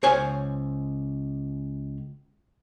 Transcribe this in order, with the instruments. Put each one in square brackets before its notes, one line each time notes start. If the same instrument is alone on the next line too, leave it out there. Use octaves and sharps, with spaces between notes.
[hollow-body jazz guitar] C#2 C5 C#5 F5 G#5